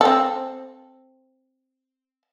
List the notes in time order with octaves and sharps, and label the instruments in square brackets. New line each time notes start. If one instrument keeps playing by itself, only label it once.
[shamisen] C4 A4